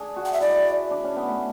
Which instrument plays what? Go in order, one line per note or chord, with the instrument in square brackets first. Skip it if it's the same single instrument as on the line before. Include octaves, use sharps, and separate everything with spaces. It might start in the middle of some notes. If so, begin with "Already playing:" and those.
Already playing: [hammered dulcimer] D4 G#4
F#4
[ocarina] F#5
E5
[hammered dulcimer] E4 [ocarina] D5
[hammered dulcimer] D4
C#4
B3
A3